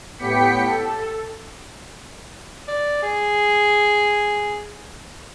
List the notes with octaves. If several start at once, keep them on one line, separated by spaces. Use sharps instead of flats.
A2 B3 G4 G5 B6 C#7
A4
D5
G#4